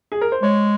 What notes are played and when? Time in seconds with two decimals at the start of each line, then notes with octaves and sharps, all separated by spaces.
0.12 G#4
0.21 A#4
0.32 C5
0.42 G#3 C#5